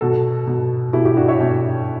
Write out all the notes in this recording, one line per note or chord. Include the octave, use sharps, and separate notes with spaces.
B2 F#4 A4
B2
B2 E4 G4
E4 G4
D4 F#4
C#5 E5
B2 G5